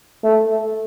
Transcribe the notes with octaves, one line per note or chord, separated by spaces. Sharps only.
A3